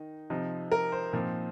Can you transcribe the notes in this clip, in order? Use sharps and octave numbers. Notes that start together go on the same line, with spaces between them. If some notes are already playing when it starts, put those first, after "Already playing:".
Already playing: D#3 D#4
C3 F3 D#4
A#4
C5
A#2 F3 C4 D#4